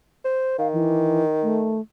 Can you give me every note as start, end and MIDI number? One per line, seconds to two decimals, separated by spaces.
0.25 0.57 72
0.59 1.77 51
0.59 0.68 77
0.73 1.23 52
1.43 1.80 57